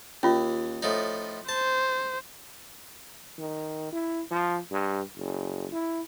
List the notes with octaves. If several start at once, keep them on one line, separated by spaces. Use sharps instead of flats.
D#2 C#4 F4
A2 F3 D#4
C5 A5
D#3
E4
F3
G2
F#1
E4